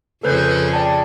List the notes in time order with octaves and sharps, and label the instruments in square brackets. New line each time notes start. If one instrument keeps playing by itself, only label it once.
[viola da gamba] F2 C#3 G#4 [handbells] A4 B4 G6
[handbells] D5 G5 A5